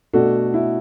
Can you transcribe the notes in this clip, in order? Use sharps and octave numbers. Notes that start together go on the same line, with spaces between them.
B2 A3 D4 F#4 A4
E4